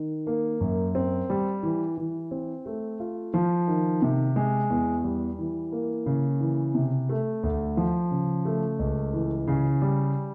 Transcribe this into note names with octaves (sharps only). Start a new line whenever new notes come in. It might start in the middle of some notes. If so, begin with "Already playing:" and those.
Already playing: D#3
A#3
F#2
C4
G3
E3
E3
C4
A3
F4
F3
D#3
C3
G#3
E2
G3
E3
A#3
C#3
E3
C3
A3
D2
F3
C#3
A3
C#2
E3
C#3
G3